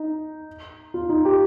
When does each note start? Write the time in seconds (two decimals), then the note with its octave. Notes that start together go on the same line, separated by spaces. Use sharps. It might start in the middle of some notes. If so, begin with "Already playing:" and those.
Already playing: D#4
0.94 F4
1.09 D#4
1.25 G4